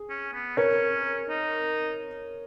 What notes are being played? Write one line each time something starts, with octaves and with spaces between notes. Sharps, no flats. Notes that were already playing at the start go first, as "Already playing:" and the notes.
Already playing: G#4
C#4
B3
C#4 A#4 C#5
D#4